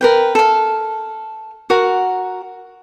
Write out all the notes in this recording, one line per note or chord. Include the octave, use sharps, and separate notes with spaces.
A#4 B4 G5
A4 F5
F#4 A#4 F#5